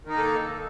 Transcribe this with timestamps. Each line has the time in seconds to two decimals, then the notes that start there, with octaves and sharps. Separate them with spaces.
0.05 D#3
0.09 D#4
0.13 A#3
0.18 A4